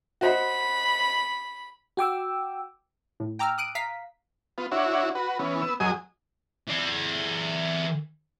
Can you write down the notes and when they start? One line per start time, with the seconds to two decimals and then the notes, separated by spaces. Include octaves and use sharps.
0.21 F#4 C5 D#5 B5
1.97 F#4 G5 D6 E6
3.20 A2
3.39 G5 A#5 D6 E6 F6
3.58 D#6 F#6 D7 D#7
3.75 F5 A#5 B6
4.58 B3 F4
4.72 D4 E4 F#4 C#5
5.15 F#4 B4
5.39 E3 B3 C#4
5.62 B3 E6
5.80 F#2 F#3 G#4 D#5 G#5 D#6
6.67 E3 D5